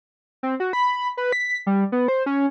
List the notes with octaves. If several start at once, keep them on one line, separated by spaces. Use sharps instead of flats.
C4
F#4
B5
B4
B6
G3
B3
C5
C#4